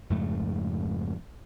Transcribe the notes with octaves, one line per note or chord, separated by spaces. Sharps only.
F2 G#2 C#3 A3